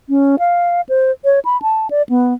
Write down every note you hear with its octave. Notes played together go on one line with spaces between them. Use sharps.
C#4
F5
C5
C#5
B5
A5
D5
B3